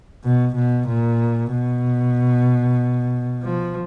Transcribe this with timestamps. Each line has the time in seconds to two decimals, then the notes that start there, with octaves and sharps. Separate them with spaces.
0.24 B2
0.55 B2
0.88 A#2
1.51 B2
3.42 F3